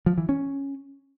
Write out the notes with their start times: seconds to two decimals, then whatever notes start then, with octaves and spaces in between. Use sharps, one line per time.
0.06 F3
0.18 E3
0.29 C#4